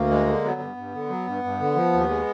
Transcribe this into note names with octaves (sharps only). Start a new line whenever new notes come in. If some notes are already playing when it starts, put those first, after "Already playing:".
Already playing: D2 A#3
G#3
D3
F#3 B3
G2
G2
D3
F#3
G2
G2
D3
F3
D#2
G#3